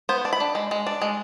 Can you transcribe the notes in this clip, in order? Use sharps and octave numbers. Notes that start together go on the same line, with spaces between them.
B3 C5
D4
B5
D4
G#3
G#3
D4
G#3